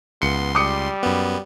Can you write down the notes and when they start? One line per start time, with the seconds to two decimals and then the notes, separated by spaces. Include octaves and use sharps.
0.22 C#2 B3 C6 C#7
0.55 G3 D6 D#6 C#7
1.03 F#2 B3